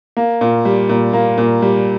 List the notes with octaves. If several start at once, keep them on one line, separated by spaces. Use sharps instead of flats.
A#3
A#2
G3
A#2
A#3
A#2
G3